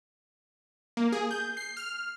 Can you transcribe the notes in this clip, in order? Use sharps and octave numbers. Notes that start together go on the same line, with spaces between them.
A#3
G#4
G6
C7
F6